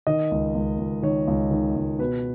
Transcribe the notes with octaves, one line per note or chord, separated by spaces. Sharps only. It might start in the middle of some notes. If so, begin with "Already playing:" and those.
D#3 D#5
C#2
C#2
C#2
D#3 C#5
C#2
D#3
C#2
B2 B4